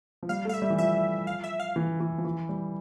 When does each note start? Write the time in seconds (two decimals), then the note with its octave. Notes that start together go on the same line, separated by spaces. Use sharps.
0.23 F3
0.29 G3 F5
0.45 A3 F5
0.54 E5
0.62 G3
0.70 E3
0.78 F3 E5
1.27 F5
1.44 E5
1.60 F5
1.76 E3
2.00 E3
2.18 F3
2.25 E3
2.49 G3